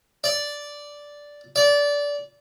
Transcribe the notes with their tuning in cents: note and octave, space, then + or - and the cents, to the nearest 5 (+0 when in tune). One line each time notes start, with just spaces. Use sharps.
D5 -5
D5 -20